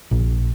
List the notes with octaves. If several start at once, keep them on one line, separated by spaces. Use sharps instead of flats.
A#1